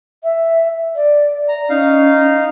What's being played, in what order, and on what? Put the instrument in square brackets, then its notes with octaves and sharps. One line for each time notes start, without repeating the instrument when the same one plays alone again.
[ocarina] E5
D5
[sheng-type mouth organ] A#5
[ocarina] C#4 [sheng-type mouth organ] D#4 F5